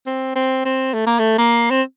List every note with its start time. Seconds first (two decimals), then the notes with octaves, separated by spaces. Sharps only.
0.07 C4
0.36 C4
0.65 C4
0.94 A3
1.07 A#3
1.20 A3
1.38 A#3
1.71 C4